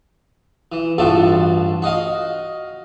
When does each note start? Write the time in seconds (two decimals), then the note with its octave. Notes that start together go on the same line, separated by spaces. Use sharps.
0.72 E3
0.98 A1 G2 F3 F#4 A4
1.82 F#4 D#5 F5